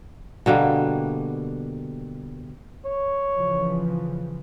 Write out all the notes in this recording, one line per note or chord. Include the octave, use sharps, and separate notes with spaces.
B2 D3 G3 A#3
C#5
C#3 E3 F3